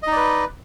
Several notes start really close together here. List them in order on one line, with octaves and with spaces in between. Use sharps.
D#5 D#4 D5 B4